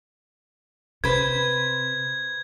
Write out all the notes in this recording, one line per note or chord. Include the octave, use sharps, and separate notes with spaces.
C3 B4 C5 G#6